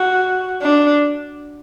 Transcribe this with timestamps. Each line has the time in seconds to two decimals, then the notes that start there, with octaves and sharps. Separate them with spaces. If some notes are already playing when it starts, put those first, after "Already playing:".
Already playing: F#4
0.62 D4